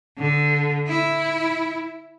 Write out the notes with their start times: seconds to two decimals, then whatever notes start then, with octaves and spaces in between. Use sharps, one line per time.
0.19 D3
0.87 E4